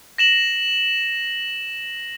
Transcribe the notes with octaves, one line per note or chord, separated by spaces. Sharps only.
A#6 E7 F#7